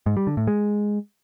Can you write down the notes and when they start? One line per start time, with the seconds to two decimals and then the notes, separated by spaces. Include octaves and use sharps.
0.06 G#2
0.17 G3
0.27 D3
0.37 A2
0.47 G#3